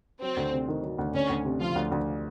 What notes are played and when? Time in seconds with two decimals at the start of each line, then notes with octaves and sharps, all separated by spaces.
0.21 F#3 C4
0.37 D2
0.52 C3
0.68 D#3
0.83 F#3
0.98 D2
1.14 D2 C#4
1.30 D2
1.45 C3
1.61 F3 F4
1.76 D2
1.92 D2